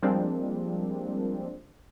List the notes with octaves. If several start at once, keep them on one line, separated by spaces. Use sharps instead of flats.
F3 G3 G#3 A#3 C4 D4